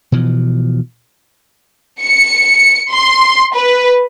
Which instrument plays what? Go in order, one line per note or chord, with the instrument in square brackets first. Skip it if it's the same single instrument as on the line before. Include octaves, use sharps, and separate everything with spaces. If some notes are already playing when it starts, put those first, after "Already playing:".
[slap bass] B2 E3 F3
[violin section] C#7
C6
B4